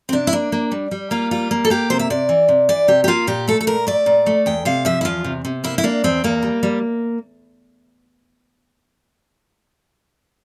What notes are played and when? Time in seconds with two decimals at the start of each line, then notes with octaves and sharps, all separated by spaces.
0.09 C4
0.12 C3 D4
0.27 E4
0.33 A#3 D4
0.52 A#3
0.72 G3
0.91 G3
1.11 A#3 F4
1.31 G3 F4
1.51 A#3
1.65 A4
1.70 A#3 G4
1.90 C3 C5
1.99 E5
2.10 C3 D5
2.29 E3
2.49 C3
2.69 E3 D5
2.88 C3 G4
3.04 G4
3.08 A#3 F4
3.27 A#2 G4
3.48 A3 A4
3.61 A4
3.67 A#2 A#4
3.87 A3 D5
4.06 A#2
4.26 A3
4.46 E2 G5
4.65 C3 F5
4.85 F3 E5
5.01 E4
5.05 E2 F4
5.24 C3
5.45 C3
5.64 A#3 E4
5.78 E4
5.84 A#3 D4
6.04 E2 C4
6.24 E2 A#3
6.43 G3
6.63 G3